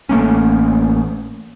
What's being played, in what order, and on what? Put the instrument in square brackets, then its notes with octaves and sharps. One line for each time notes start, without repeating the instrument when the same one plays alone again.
[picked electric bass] A1 A3 A#3 C#4